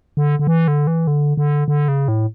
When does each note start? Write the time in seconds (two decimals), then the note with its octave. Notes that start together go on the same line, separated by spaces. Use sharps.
0.17 D3
0.39 D3
0.47 E3
0.68 D3
0.87 E3
1.07 D3
1.37 D3
1.68 D3
1.88 C#3
2.08 A2